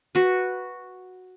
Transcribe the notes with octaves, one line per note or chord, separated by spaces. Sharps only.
F#4 B4